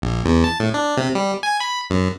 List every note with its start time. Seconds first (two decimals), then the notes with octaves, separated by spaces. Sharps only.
0.02 A#1
0.26 E2
0.44 A5
0.60 A2
0.74 D4
0.97 C3
1.15 G3
1.43 G#5
1.60 B5
1.90 F#2